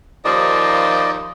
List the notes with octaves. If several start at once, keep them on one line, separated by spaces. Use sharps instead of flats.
D#2 F3 D5 D#5